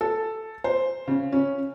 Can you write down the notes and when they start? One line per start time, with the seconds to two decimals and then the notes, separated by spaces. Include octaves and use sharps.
0.01 A4
0.64 C5
1.08 C#3
1.32 C#4